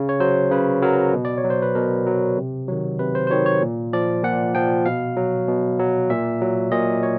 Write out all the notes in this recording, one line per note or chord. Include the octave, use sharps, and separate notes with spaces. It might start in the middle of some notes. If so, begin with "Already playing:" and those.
Already playing: C#3
C#5
F#3 C5
C#3 B4
F#3 A#4
B2
D5
C#5
F#3
C5
B4
B2 A#4
F#3
C3
D#3 F#3
C3 B4
C5
C5
D#3 F#3 C#5
C#5
A#2
F3 D5
A#2 F#5
F3 G5
B2 F5
F#3
B2
F#3
A#2 E5
F#3
A#2 D#5
C#5